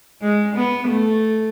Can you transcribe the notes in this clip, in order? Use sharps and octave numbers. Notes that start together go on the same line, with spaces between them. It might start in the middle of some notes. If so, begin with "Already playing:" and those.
G#3
B3
A3